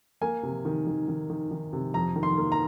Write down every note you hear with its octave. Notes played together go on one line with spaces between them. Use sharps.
A#3 G#5
C3
D#3
D#3
D#3
D#3
D#3
C3
F2 A#5
D#3
C6
A#3
A#5